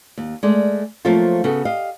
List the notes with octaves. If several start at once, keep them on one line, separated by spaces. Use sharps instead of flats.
D#2
G#3 A3 D5
F3 F#3 A3 A#3 C4 F4
C#3 B3 F#4 A4
G4 D#5 F5